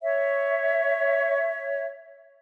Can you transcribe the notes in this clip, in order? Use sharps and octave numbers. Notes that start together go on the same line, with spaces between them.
C#5 E5